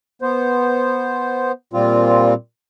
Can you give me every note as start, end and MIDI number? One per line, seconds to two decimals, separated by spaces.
0.22 1.52 59
0.22 1.52 72
1.73 2.34 46
1.73 2.34 55
1.73 2.34 60
1.73 2.34 65